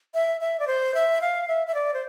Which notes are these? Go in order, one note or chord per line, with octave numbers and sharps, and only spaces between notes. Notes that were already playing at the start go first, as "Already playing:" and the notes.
E5
E5
D5
C5
E5
F5
E5
E5
D5
C5